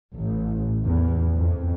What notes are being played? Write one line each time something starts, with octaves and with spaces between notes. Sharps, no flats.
A1
E2
F2